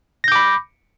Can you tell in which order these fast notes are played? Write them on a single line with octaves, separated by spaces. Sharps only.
A#6 G6 D6 B5